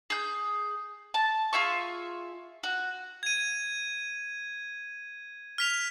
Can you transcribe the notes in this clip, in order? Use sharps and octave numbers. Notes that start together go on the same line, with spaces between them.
G#4 G6
A5
F4 G#4 E5 C#6
F#4
G#6 D#7
F6 B6 F7